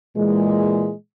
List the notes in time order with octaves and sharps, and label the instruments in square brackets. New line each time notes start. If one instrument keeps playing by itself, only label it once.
[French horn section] A#2 E3 G#3